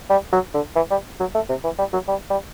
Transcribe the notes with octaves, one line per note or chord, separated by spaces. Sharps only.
G3
F#3
D3
E3
G3
F#3
A3
C3
E3
G3
F#3
G3
G3